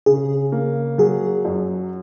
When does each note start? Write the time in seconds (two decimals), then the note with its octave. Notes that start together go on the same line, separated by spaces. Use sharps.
0.06 C#3 G#4
0.52 A#3
0.98 F#3 G#4
1.45 F#2